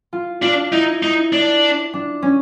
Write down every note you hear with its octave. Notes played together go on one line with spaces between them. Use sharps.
F4
D4 F4
D#4 E4
D#4
D4
D4
C#4